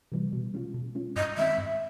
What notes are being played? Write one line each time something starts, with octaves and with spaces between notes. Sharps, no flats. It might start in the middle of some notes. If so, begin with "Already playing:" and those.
C3 E3 G3
B2
G#3 C#4 F4
B2
G#3 C#4 F4
G2 D#5
D#3 G#3 C4 E5
G2